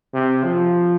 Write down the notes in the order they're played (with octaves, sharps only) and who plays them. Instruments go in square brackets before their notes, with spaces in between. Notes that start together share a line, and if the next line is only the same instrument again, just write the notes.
[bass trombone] C3
F3